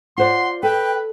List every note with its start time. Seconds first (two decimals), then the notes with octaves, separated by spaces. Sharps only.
0.18 F4 C5 D5 F#5 C6
0.63 A4 B4 G5